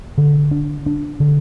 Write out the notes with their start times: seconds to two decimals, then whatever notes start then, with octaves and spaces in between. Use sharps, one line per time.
0.18 D3
0.51 D4
0.86 D4
1.20 D3